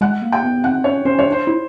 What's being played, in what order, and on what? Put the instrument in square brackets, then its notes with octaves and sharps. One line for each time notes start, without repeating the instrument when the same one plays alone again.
[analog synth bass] G#3 [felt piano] F#5
[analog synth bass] A#3
[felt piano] G5
[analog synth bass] B3
[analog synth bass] C4 [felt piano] F#5
[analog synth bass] C#4 [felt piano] C#5
[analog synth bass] C#4 [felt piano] C5
[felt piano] C#5
[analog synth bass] D4
[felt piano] C5
[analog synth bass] E4